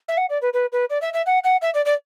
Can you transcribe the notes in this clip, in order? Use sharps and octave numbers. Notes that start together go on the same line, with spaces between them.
E5
F#5
D5
B4
B4
B4
D5
E5
E5
F#5
F#5
E5
D5
D5